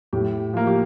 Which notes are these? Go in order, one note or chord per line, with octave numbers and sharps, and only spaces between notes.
A2 G4
F3 A#3
G4